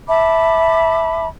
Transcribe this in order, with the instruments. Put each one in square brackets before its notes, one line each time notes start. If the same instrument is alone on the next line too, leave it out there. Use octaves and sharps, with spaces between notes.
[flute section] E5 A5 B5 D6